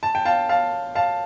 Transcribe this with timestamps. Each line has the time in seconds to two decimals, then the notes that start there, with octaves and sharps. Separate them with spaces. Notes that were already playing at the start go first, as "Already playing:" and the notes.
0.03 A5
0.15 G5
0.25 F5 A5
0.49 F5 A5
0.95 F5 A5